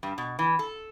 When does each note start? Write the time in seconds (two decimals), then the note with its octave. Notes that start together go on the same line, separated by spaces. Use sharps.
0.03 G2
0.18 B2
0.39 E3
0.59 A4